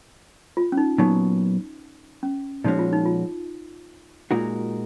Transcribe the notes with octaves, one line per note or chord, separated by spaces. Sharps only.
F4
C#4
D#4
A#2 F#3 B3 D#4
C#4
A#2 F3 G#3 C#4 D#4 F#4
F4
D#4
F4
A#2 G#3 D#4 F4 F#4 A#4